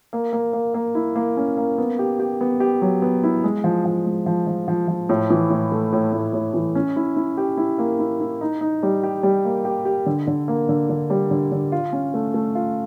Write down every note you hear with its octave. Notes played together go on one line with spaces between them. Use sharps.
A#3
A#3
A#3
A#3
E4
A#3
C#4
A#3
B3
G4
G4
B3
G4
F#3
B3
E4
G#3
F3
F3
G#3
F3
F3
F3
F3
A2
E3
A2
A3
A2
A2
A2
E3
C#4
E4
E4
G4
E4
A#3
E4
E4
D#4
D#4
G3
G4
G3
A#3
G4
G4
D3
D3
A#3
D3
D3
G3
D3
D3
F4
C#4
A3
A3
F4